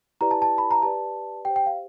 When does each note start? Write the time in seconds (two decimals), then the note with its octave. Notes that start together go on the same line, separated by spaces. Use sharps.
0.21 E4 G4 B4 D5 A#5
0.31 A5
0.42 A5
0.58 B5
0.71 A#5
0.82 G4 B4 D5 A5
1.45 G4 C5 G5
1.56 G5
1.66 F5